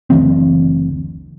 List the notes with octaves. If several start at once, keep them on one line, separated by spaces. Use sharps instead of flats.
F#1 D2 E3 C4